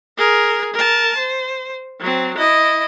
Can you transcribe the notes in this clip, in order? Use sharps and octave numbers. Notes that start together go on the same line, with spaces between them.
G#4 A#4
A#4 A5
C5
F#3 C4
E4 D#5